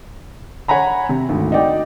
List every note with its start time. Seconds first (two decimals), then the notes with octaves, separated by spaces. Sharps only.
0.68 C#5 F#5 G#5 A#5 B5
1.09 C3
1.29 G#1 D2
1.52 D#4 F#4 D5 G5